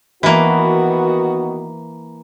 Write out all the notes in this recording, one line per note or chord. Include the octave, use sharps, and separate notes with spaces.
D#3 E3 A#3 B3 F#4